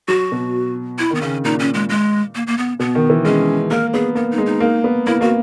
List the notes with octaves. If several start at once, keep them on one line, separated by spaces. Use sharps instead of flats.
F#3 F#4
B2
E4
D#3 B3
C#3 C#4
A#2 D#4
C#4
G#3
G#3
A#3
A#3
B3
B2 B3
D#3
E3
G#3 C#4
A#3 A#4
B3 G#4
A#3 B3
D#4
G#3
D#4
A#3
B3
A#3 E4
A#3 F#4